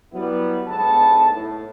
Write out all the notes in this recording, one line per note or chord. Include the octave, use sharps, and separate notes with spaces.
F#3 G3 B3 E4
G1 G#2 B3 A4 A5
A2